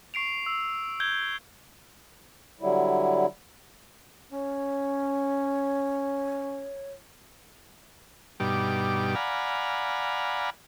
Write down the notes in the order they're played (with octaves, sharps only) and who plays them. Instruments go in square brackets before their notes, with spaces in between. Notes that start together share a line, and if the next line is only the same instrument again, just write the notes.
[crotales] C#6 C7 D7 F7
E6
G6 G#6 G7
[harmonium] D3 F#3 G3 E4
[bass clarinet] C#4 [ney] C#5
[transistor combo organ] G2 B2 G3 D#4 G4 D6
D5 F5 F#5 G#5 A#5 B5